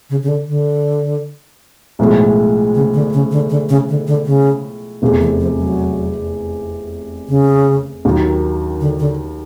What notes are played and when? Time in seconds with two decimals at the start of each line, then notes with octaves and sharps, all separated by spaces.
0.10 C#3
0.23 C#3
0.28 D3
0.48 D3
1.99 B1 A2 F3 G#3
2.75 C#3
2.94 D3
3.13 C#3
3.31 D3
3.50 D3
3.69 C#3
3.89 D3
4.07 D3
4.26 C#3
5.02 F1 E2 C3
5.21 E3
5.40 F3
5.59 F#3
7.29 C#3
8.05 D#2 D#3 F#3
8.81 D3
8.99 D3